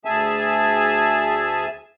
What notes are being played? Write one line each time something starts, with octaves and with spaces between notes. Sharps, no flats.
D2 G#4 E5 G#5 A5